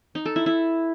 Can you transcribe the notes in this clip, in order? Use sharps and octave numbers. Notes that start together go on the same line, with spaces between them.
D#4
A4
E4
E4